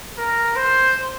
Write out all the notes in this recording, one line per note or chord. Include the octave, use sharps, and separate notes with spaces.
A#4
C5